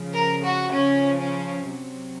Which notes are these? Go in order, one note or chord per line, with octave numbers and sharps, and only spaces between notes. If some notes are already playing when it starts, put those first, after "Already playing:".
Already playing: C#3 F3
A#4
F#4
C#3 F3 C#4
C#4
C3 F#3